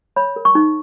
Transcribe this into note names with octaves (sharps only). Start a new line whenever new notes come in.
C#5 B5
A#4
C#6
D#4